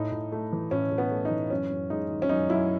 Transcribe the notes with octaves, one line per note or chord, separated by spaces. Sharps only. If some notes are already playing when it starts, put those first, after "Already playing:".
Already playing: A2 D#4
A2
A3
E3
A2 C#4
A2
B3
A3
D#4
E3
F#2 C#4
F#2
G#3 D#4
D#3
C#4
F#2 D#4
F#2 E4